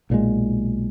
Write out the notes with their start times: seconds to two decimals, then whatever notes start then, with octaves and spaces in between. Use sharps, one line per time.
0.10 B1 A#2 F3 G#3